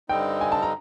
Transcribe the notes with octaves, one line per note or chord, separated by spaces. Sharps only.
G2 D3 G3 C4 D#4 G5
G#5
A5
A#5